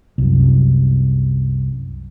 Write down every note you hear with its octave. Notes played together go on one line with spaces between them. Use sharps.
C2 F#2